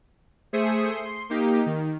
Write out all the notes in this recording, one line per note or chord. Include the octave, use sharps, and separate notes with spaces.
A3 G#4 C5 E5 D#6 C#7
C6 C7
A#3 D#4 G4
D#3